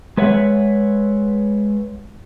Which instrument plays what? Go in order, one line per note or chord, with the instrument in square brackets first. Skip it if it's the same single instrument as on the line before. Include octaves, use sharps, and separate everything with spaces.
[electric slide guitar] G#3 B4 C#5 E5 F#5